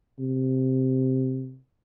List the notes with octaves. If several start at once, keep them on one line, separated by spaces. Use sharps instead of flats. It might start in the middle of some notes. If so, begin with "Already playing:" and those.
C3